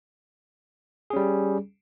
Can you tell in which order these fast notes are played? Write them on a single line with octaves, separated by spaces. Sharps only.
G#4 C#4 G3